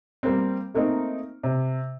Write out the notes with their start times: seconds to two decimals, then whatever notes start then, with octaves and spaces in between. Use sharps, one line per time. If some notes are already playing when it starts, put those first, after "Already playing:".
0.23 G3 A#3 C4
0.74 A3 A#3 C4 D#4
1.43 C3